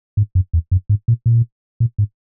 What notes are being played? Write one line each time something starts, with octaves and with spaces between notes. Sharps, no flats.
G#2
F#2
E2
F#2
G#2
A#2
A#2
A#2
G#2